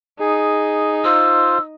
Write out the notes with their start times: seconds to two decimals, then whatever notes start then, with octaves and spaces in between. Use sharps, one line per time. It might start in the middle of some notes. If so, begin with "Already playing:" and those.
0.20 D#4 G#4
1.05 F4 C5 E6